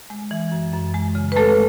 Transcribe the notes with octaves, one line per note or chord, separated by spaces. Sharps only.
G#3
E3
F#2
F#2
G#3
C#3
B4
G#3 A3 A4